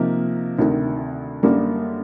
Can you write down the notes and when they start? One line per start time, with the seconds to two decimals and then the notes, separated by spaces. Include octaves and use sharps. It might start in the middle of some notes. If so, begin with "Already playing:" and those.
Already playing: C3 F3 A#3 D#4
0.59 D2 C3 D#3
1.43 F#2 D3 G3 A#3